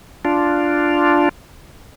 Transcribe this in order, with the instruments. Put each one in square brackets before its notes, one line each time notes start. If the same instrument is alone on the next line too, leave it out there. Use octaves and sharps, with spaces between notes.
[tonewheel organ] D4 F4